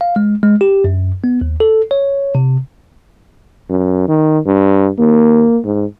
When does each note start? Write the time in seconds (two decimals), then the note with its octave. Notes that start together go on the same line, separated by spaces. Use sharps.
0.01 F5
0.16 G#3
0.43 G#3
0.61 G4
0.84 F#2
1.24 B3
1.41 D#2
1.60 A4
1.91 C#5
2.35 C3
3.70 F#2
4.08 D#3
4.46 G2
4.99 D#2 A#3
5.65 G#2